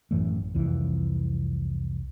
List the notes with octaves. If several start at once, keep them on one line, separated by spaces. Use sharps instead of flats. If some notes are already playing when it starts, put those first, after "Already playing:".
A1 F#2 E3 A3
C2 F2 E3